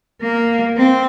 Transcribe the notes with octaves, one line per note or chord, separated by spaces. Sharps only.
A#3
C4